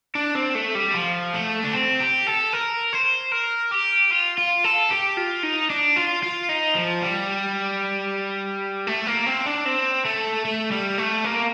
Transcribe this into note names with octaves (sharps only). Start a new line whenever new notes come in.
D4
C4
A3
G3
F3
A3
D4
C4
G4
A4
A#4
C5
A#4
G4
F4
F4
A4
G4
F4
D#4
D4
F4
F4
D#4
F3
G3
A3
A#3
C4
D4
C4
A3
A3
G3
A3
A#3